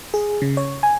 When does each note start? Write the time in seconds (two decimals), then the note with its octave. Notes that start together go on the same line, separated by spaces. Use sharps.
0.14 G#4
0.42 C#3
0.57 C#5
0.83 G#5